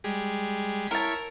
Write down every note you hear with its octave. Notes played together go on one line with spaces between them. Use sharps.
G3 G#3
E4 A#4 C#5 A5